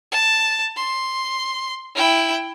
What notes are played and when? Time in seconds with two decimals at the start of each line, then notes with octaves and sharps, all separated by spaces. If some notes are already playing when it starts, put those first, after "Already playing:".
0.12 A5
0.76 C6
1.95 E4 G5